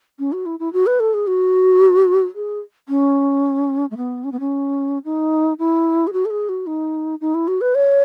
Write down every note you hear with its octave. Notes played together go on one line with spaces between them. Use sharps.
C#4
F#4
E4
E4
F#4
B4
A4
G#4
F#4
G#4
C#4
A3
B3
C#4
B3
C#4
D#4
E4
G#4
F#4
A4
G#4
F#4
D#4
D#4
E4
F#4
B4
C#5